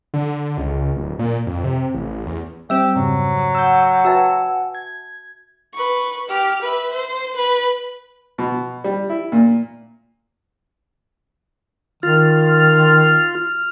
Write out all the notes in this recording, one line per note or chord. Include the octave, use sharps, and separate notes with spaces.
D3
C#2
D1
A#2
F2
C3
A1
E2
G3 C4 G4 E5 E6
F2 G#2 C#3 F#3
F#5 E6 G6
F#4 B4 E5 G#5 A5 E6
G#6
B4 C#6
G4 F6
B4 E5
C5
B4
B2
G3
E4
A#2
D#3 F4 F6